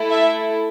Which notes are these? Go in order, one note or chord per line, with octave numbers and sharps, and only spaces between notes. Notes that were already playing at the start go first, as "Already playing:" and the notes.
Already playing: A3 E4 A4
E5